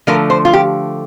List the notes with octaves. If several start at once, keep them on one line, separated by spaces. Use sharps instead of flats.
D3 F3 A3 A#4
C5
F4
G4